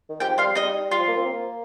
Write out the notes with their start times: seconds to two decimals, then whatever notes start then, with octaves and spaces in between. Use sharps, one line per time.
0.09 D#3
0.20 F3 G4 G5
0.38 G3 F4 F5
0.55 G3 D#4 D#5
0.91 G3 F4
0.99 F3
1.08 A#3
1.17 C4
1.25 A#3